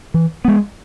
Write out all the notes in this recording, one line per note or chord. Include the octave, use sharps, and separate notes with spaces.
E3
G#3 B3